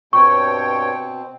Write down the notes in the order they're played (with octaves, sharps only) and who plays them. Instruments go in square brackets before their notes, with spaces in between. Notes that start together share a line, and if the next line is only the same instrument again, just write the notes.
[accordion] G2 C#5 G5 [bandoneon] B2 C4 [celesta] C#6